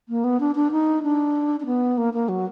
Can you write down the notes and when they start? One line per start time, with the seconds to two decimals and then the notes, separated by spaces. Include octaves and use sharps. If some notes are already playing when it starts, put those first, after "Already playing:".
0.09 A#3
0.24 B3
0.40 D4
0.55 D4
0.72 D#4
1.03 D4
1.60 D4
1.66 B3
1.98 A#3
2.14 A#3
2.29 F#3